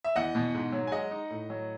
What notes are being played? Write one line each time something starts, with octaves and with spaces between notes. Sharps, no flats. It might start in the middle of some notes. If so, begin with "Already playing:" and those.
E5
E2 D#5 F#5
B2
G#2
F#3
G#5
G#3 D#5 F#5
D#4
A2
F#3